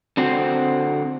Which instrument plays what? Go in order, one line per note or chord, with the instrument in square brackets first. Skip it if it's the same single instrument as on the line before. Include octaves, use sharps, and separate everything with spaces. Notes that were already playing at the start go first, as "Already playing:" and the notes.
[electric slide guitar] D3 C4 F#4 C5